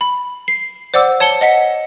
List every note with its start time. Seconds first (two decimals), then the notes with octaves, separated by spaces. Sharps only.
0.01 B5
0.48 C7
0.94 C5 D5 F#5 D6 E6
1.20 C#5 A5 C#7 G7
1.41 D#5 F#5 B6 C#7